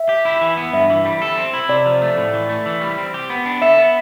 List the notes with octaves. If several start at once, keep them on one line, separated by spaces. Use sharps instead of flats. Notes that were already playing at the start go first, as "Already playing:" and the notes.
Already playing: E5
G4
E4
E3
B3
G2 E5
E3
G3
A4
C4
E4
C3 D5
F3
A3
A2
E3
A3
E3
G3
C4
G4
B3
D4
A4 E5
B3